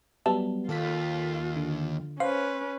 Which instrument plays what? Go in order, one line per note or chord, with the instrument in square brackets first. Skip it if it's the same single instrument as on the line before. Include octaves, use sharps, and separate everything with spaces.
[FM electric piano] F#3 G3 B3 [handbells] E5 A5
[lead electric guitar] D#2 [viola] F4 [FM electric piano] A4 F5 B6
[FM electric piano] D3
[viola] C#4 B4 [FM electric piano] C5 [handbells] F5